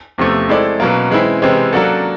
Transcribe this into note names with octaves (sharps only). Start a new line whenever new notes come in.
E2 C3 F3 A3
G#3 C4 E4 A4 D5
B2 F#3 A#3
E3 G#3 C4 E4
C3 E3 G#3 C4
F#3 A#3 D4 F#4 A4